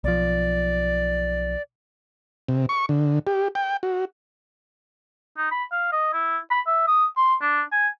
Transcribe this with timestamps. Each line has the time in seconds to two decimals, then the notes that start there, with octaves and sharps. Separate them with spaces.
0.04 B1 F3 D5
2.48 C3
2.69 C#6
2.89 D3
3.27 G4
3.55 G5
3.83 F#4
5.37 D#4
5.52 B5
5.72 F5
5.92 D#5
6.13 E4
6.51 B5
6.67 E5
6.87 D#6
7.17 C6
7.41 D4
7.72 G#5